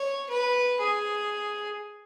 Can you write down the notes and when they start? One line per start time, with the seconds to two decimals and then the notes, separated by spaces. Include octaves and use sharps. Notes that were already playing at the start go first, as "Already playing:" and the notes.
Already playing: C#5
0.30 B4
0.79 G#4